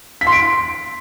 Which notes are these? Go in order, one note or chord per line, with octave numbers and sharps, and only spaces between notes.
B6
C6
D7